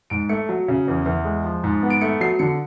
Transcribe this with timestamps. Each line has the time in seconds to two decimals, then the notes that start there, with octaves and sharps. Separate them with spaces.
0.10 G#2 D7
0.29 A3 C#7
0.49 F#3
0.68 C#3
0.88 E2
1.06 E2
1.25 G#3
1.44 F3
1.64 G#2
1.83 B3
1.90 D7
2.01 A3 C#7
2.21 F#3 C7
2.39 D3 C#7